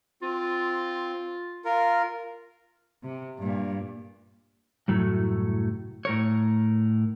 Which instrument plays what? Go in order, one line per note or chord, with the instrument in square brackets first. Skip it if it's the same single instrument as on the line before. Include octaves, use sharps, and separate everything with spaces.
[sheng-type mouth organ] C4 [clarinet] F4
[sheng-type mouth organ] F4 A#4
[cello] C3
G2 A#2
[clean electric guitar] C2 F#2 A2 F#3 A3
A2 A#4 C#5